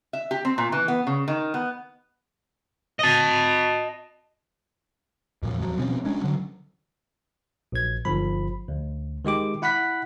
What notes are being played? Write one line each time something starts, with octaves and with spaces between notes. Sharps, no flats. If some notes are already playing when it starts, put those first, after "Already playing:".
E5
G4
C4
A#2
E3
B3
C#3
D#3
B3
D#5 A5
F2 A#2 F3
D#2 F3 F#3
B2 F3 C4 C#4
G#3 C#4 D4
D3 F#3
A#1 G#6
G1 F3 B5
D2
D#3 G#3 G4 D6
E4 F#5 B5 F#6 B6